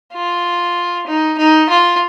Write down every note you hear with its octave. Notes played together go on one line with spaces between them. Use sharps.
F4
D#4
D#4
F4